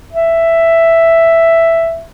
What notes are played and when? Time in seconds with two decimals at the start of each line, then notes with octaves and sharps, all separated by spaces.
0.13 E5